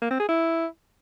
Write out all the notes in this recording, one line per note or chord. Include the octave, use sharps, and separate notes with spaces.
A#3
C4
G#4
E4